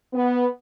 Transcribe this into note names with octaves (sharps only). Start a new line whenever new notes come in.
B3